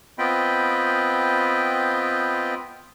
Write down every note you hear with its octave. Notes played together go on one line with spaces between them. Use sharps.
B3 C4 F4 D#5 G5 B5